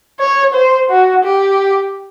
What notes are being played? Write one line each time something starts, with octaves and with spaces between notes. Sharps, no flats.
C#5
C5
F#4
G4